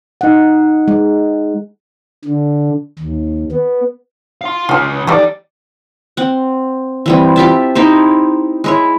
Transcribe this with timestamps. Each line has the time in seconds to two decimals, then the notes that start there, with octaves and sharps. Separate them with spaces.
0.21 D#4 F#5
0.88 G#3
2.25 D3
2.99 D#2
3.52 B3
4.41 F5 C6
4.69 C#2 C#3 F4 G#5
5.07 E3 G3 A3 D#4 D5
6.17 C4 F#5
7.06 E3 G3 C4
7.36 F4 G4 E5 A5
7.75 D#4 E4 G4 C5
8.64 G#3 E4 C#5